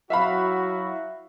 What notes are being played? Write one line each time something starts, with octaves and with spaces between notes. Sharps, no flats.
F#3 E4 F#4 E5 F5 B5